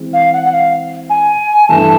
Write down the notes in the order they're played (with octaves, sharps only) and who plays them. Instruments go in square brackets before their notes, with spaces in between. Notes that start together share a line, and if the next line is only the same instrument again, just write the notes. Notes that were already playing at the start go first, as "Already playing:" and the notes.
Already playing: [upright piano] E3 G#3 C4
[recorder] F5
F#5
F#5
F5
G#5
[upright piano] G2 E3 A3 [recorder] A5